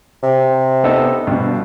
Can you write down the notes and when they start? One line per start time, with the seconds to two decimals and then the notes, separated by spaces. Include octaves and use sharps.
0.23 C3
0.84 B3 D#4 A4
1.27 G2 B2